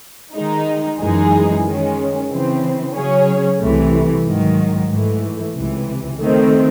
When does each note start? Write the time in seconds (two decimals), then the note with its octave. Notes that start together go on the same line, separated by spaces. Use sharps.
0.35 D#3 G#3 D#4
1.00 F#2 E3 G#3 D#4 G#4
1.66 D#3 G#3 C#4
2.31 C#3 E3 C4
2.95 C#3 F#3 C#4 G#4 C#5
3.60 C2 C3 E3 A3
4.25 G#2 D#3 F#3
4.90 G#2 E3 A3
5.55 C#2 C3 E3
6.20 D#3 A3 C4